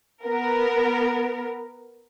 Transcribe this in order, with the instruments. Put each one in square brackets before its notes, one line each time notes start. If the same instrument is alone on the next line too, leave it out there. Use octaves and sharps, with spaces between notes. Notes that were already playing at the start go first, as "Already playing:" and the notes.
[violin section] B3 A#4